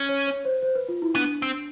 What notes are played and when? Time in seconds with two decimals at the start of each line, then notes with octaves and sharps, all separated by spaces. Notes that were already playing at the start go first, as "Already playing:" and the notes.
Already playing: C#4
0.09 C#5
0.27 C#5
0.45 C5
0.62 C5
0.75 B4
0.89 F4
1.02 E4
1.15 B3 D4
1.42 C4